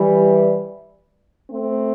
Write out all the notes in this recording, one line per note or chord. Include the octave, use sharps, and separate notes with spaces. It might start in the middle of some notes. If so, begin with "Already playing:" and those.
Already playing: E3 G3
A3 C4